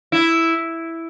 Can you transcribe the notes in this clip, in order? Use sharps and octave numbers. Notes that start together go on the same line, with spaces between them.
E4